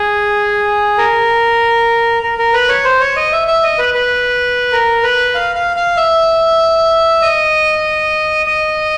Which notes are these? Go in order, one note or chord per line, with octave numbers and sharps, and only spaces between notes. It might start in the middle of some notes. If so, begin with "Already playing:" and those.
Already playing: G#4
A#4
A#4
A#4
B4
C#5
C5
C#5
D#5
E5
E5
D#5
B4
B4
A#4
B4
F5
F5
F5
E5
D#5
D#5